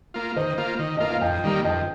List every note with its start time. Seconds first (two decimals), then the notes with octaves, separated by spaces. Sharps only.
0.14 A#3 F4
0.36 D#3 C5 D#5
0.58 A#3 F4
0.79 D#3
0.97 A#3 F4 D#5
1.10 F5
1.21 F2 D#5 G5
1.44 D#3 G3 A#3
1.64 F2 D#5 G5